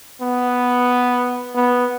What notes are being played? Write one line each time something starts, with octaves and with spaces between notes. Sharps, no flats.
B3
B3